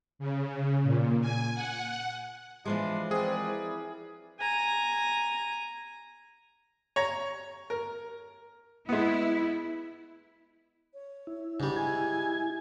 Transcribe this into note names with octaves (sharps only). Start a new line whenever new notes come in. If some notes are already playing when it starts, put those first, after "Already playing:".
C#3
A#2
G#5
F#5
E3 F3 G#3 D4 B4 C6
C4 G#4 A#4 B4 D5
E4
G#5 A#5
C#5 A#5
A#4
G#3 B3 E4
C#5
E4
G#2 C#3 G3 D4
E4 G#5 G#6